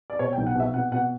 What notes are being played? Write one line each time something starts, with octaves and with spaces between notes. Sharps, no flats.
D5
B2 C#5
G5
B1
F#5
B2 E5
B2 F#5
B2 F#5